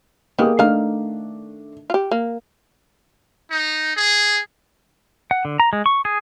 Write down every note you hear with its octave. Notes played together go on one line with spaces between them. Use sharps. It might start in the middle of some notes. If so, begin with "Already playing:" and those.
D#3 A#3 B3 G4 G#4 D#6
D#3 A3 D4 F5 A#5
F4 G4
A#3
D#4
G#4
F#5
D3
A#5
G#3
C#6
G#4